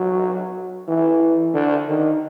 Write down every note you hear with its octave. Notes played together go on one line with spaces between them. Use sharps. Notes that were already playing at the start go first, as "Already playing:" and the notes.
Already playing: F#3
E3
D3
D#3